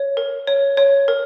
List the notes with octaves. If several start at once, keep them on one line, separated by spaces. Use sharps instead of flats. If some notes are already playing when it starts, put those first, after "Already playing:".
Already playing: C#5
A#4
C#5
C#5
A#4